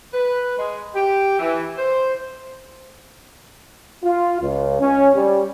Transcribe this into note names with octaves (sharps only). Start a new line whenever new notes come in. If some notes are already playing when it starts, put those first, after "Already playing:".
B4
G#3
G4
E3
C5
F4
C#2
C#4
G3